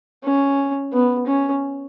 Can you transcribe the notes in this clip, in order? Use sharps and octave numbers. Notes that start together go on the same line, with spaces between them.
C#4
B3
C#4